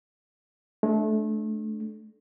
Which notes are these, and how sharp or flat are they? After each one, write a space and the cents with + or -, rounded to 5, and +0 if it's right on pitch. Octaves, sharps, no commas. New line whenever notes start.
A3 -25 D4 +0